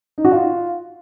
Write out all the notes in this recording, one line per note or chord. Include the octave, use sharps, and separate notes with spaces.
D#4
F#4
F4